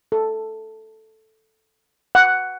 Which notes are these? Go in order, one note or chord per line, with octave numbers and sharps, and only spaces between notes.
A4
F#5